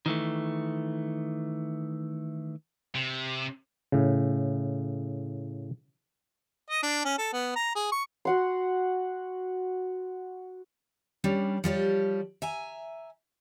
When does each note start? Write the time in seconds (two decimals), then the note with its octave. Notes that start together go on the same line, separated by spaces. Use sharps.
0.06 D#3 E3 A3
2.95 C3
3.92 A2 C#3
6.70 D#5
6.83 D4
7.05 C#4
7.18 A4
7.33 B3
7.55 A#5
7.75 G#4
7.92 C#6
8.25 F#4 F#5 C6
11.24 G3 C#4 D4
11.64 F3 G3 G4 C#5
12.42 E5 G#5 A#5